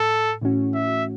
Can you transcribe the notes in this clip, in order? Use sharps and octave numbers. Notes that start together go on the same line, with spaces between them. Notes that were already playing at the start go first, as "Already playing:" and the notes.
Already playing: A2 A4
A2 E3 A3 C#4 F#4
E5